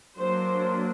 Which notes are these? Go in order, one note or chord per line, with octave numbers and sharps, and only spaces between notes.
F#3 A#3 D4 C5